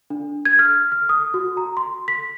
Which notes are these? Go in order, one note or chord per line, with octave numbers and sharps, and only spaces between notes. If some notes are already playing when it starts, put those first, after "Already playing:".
D4
G#6
F6
F6
D#6
F#4
A#5
C6
B6